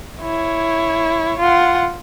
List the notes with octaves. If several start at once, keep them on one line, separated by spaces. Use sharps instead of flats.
E4 C#5
F4 F#5